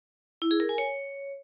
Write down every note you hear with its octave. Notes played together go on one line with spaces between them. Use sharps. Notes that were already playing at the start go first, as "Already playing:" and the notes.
E4
G#4
A#4
G#5
C#5